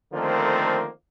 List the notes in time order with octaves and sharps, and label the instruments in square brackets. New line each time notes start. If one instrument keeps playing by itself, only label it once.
[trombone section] D3 D#3 F3 A3 A#3 C4